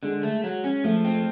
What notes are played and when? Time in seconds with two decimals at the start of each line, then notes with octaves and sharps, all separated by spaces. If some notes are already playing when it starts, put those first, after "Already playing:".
0.03 D3 G#3
0.23 A3
0.44 F#3
0.64 C#4
0.84 F3 A3
1.05 C4